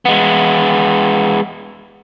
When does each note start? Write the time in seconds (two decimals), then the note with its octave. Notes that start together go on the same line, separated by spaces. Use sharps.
0.05 G#3 B3